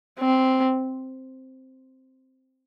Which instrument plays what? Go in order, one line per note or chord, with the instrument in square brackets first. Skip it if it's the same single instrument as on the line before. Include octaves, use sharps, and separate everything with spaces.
[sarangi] C4